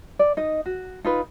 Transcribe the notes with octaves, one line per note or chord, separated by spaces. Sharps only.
D5
D#4 D#5
F#4
D#4 F4 B4